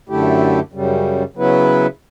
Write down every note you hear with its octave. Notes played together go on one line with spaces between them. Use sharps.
F#2 D3 A3 E4 G4
F#2 C#3 G3
C#3 F#3 B3 E4 B4